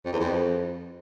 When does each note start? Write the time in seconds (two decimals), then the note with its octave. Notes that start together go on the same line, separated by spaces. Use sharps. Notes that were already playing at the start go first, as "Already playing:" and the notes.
0.05 F2
0.12 E2
0.20 F2